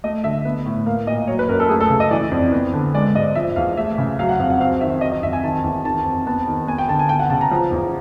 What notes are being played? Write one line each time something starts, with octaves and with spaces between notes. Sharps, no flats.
A3 D#5
D3 E5
B3
A2
A#3 F5
A#2 D#5
F#3 C#5
B4
F#2 A#4
A4
A3 G#4
A4
C#3
D#5
E3 D5
F2
B3
D3
G#3 D5
G#2 D#5
F3 E5
E2 F5
A3 E5
C#3
F#3 F5
F#5
F2 F5
F#5
C4 F5
D#3 E5
F#3 D#5
D#5
F2 E5
G#5
D#3 A5
E2
D#3 A5
F2
B3 A5
D#3
B3 G#5
G5
D3 A5
G#5
B3 G5
F#5
C#3 A5
A#5
F3
E2